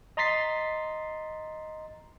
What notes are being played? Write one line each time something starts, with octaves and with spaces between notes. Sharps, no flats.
D#5 A#5 C6 A6 B6 C7